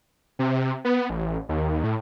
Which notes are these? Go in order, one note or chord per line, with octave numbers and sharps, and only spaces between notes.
C3
B3
A1
D#2
A2